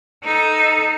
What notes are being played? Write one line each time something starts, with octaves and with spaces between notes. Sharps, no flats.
D#4 A4